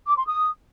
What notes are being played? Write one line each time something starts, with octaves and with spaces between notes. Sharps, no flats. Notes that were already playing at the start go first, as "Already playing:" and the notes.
D6
C6
D#6